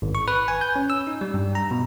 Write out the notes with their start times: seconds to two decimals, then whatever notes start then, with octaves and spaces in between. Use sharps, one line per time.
0.02 G#1
0.15 C#6
0.28 B4
0.48 G#5
0.61 G6
0.76 C#4
0.90 E6
1.07 D#4
1.21 G3
1.34 G2
1.55 A#5
1.71 B2